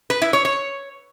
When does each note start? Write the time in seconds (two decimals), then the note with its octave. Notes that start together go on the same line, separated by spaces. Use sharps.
0.10 B4
0.22 E4
0.33 C#5
0.45 C#5